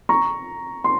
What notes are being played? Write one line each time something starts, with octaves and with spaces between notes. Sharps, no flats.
A#5 C#6
C6